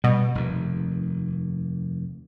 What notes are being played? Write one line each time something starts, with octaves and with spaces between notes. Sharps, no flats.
B2 G3
F1 D#2